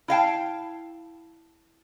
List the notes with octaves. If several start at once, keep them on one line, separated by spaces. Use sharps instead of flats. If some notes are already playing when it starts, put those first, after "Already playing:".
E4 F5 G5 A5